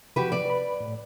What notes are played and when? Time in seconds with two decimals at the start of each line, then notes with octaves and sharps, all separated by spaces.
0.16 C3 F3 F#4 G4 B4
0.32 D5
0.46 B4 B5
0.80 A2